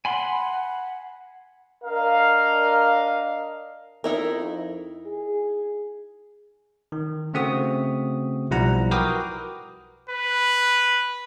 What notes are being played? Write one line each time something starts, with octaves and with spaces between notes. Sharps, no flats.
F#5 G#5 B5 C6
D4 A#4 D#5 F5
F2 D#4 E4 A#4
G#4
D#3
C#3 A3 C4 F#4 D#6
B1 F3 G3 E4 F#5 A#5
F#4 A#4 B4 G5 D6 D#6
B4